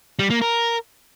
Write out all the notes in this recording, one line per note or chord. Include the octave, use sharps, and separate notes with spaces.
G3
A#3
A#4